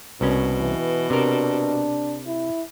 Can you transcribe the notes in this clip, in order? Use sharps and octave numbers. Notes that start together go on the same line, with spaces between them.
C2 B2 C#4
E3
C3 D4 A#4
E4